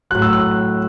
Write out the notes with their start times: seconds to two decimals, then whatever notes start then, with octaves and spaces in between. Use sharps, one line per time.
0.11 A2 F#3 F#6
0.22 E6
0.33 F#6